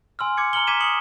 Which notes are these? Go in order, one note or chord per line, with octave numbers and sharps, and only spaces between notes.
G#5 C6 E6 F6
D6 G#6 C#7
A#5 F6 C#7 F#7 G7
A#5 D6 G#6 B6 D#7 E7
D#6 C#7 F#7